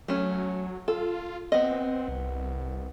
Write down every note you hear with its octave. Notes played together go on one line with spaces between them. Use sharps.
F#3 A3 C#4
F4 A4
B3 C4 D#5
C2